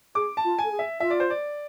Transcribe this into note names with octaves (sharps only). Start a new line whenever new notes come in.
G#4 D6
A5
F4
G#5
A4
G#4
E5
F4 E5
D5
C5
D5